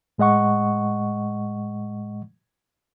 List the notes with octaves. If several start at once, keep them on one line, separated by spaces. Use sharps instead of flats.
A2 G#3 D#5 F#5 C#6